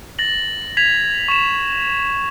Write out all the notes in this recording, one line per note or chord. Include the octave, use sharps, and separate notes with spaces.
A6 A#6 F#7
G#6 B6 F7
C#6 E7